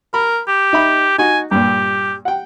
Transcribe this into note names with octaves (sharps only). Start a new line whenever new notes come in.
A#4 B5
G4
D#4 E5 B5
D#4 F#4 G#5
G2 A#2 G4
F#5 G5